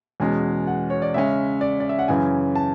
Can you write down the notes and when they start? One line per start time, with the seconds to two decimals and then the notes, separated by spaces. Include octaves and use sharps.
0.20 E2 B2 G#3 C#4 G#5
0.67 F#5
0.90 C#5
1.02 D5
1.14 C#3 G#3 C#4 E5
1.61 D5
1.80 D5
1.89 E5
1.99 F#5
2.08 F#2 C#3 E3 G#5
2.55 A5